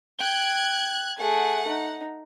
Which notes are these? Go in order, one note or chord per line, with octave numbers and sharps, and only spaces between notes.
G5 F#6 G#6
A3 G#4 F#5
D#4